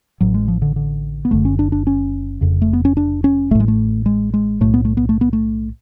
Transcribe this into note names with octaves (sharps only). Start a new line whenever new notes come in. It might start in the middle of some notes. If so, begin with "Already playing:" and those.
A1 A2 F#3
G#3
F3
D3
D3
B3
F#1 F#2 D3 A3
C#4
D4
D4
C#4
F1 F2 C#3
A3
B3
C#4
D4
C#4
A1 A2 A3
G#3
A3
G#3
G#3
B1 A2 A3
B3
A3
B3
A3
B3
A3